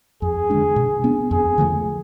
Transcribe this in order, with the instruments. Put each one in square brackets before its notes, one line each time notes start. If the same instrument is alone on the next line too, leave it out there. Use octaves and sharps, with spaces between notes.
[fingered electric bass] F2 [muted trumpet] G#4
[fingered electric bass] D3 G#3 D4
B2
B3 D4
[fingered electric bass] F2 [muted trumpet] G#4
[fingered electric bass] D3 F3 A3